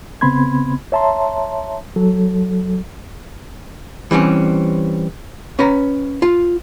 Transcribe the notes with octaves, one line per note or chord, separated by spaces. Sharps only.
C#3 B3 C4 B5 C6 G#6
C#5 E5 A5 A#5 C6
F#3 A4
E3 G3 C4 C#4
C#4 B4 A#5
F4